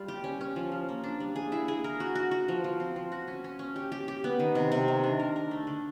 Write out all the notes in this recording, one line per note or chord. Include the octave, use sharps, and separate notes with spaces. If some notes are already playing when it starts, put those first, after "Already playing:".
Already playing: G3 F4
G4
C#4
C#4
F3
F3
A#3
D4
G3
G#4
E4
G#4
A#4
F#4
F#4
F#4
F3
F3
C4
F3
F#4
C#4
C#4
C#4
G4
G4
G4
B3
D#3
C3
C3
D#3
D4
A#4
A#4
A3
D3